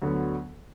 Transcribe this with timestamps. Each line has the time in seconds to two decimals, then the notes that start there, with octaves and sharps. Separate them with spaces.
0.02 D2 D3 F#3 B3